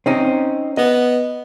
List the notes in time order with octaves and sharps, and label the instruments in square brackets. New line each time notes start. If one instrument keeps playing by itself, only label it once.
[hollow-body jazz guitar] C4 C#4 D#4
[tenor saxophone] B3 [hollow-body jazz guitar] D#5